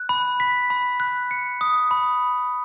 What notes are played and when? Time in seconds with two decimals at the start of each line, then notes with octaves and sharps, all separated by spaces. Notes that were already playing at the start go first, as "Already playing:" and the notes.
Already playing: F#6
0.09 B5
0.40 B6
0.70 B5
1.00 F#6
1.31 C#7
1.61 D#6
1.91 B5